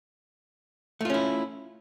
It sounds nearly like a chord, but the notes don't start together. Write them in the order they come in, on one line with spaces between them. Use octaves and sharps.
A3 F4 C#4 E4